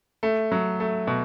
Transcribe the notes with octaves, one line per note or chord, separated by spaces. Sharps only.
A3
F#3
A3
B2